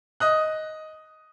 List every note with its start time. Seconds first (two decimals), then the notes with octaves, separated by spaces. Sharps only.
0.20 D#5 D#6 F#6